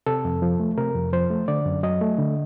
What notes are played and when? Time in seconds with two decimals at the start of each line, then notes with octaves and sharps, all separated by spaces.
0.06 C3 A4
0.25 F2
0.42 F3
0.60 A3
0.78 C3 A#4
0.95 F2
1.13 F3 C5
1.30 A3
1.48 D3 D5
1.66 F#2
1.83 F#3 D#5
2.01 A3
2.19 D3